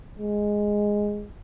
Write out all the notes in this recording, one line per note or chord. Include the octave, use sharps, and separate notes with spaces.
G#3